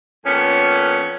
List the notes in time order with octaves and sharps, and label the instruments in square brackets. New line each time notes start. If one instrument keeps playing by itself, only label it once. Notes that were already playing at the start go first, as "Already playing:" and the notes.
[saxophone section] F2 A#2 B3 C#4